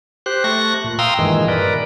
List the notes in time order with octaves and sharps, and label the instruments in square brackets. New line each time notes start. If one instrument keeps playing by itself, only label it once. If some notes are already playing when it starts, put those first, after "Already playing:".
[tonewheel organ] G4 C5 F#6
A3 C#6 F#6 A#6
A#2
F5 G5 A#5 C6 D#6 E6
G2 A#2 D#3 E3 G#3
A#4 B4 D5